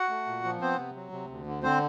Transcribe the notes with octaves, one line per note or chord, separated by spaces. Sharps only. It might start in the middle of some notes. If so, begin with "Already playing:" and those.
Already playing: F#4 F#5
A3
A#2
F3
B3 C4 C5
C3
F#3
C3
D2
D3
D3 C4 C5